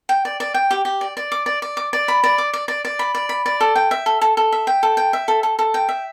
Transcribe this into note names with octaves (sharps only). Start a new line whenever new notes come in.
G5
D5
D5
G5
G4
G4
D5
D5
D6
D5
D5
D6
D5
B5
D5
D6
D5
D5
D5
B5
D5
B5
D5
A4
G5
E5
A4
A4
A4
E5
G5
A4
G5
E5
A4
A4
A4
G5
E5